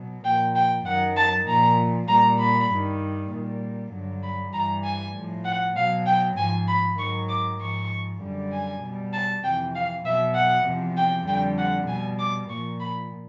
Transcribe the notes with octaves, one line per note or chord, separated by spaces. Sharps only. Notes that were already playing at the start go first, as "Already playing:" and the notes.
Already playing: B2 F#3
A#2 F3 G5
G5
F#2 D#3 F#3 F#5
A5
A#2 F3 A#5
A#2 G3 A#5
B5
G2 D#3 G3
A#2 G3
G2 D3 F#3
B5
G2 E3 G3 A#5
G#5
A2 F3
F#5
B2 F#3 F5
G5
G#2 F3 G#5
B5
G#2 D#3 F#3 C#6
D6
G#2 F3 C#6
F#2 D3 G3
G#5
B2 G3
A5
F2 C3 E3 G5
F5
B2 F#3 E5
F#5
E2 C3 F3
G5
F2 D3 G3 G5
F#5
B2 G3 G#5
D6
A#2 F3 C#6
B5